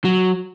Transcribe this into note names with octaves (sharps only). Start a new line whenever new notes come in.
F#3